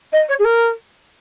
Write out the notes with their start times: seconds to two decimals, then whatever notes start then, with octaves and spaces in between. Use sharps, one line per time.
0.12 D#5
0.28 C#5
0.39 G#4
0.44 A#4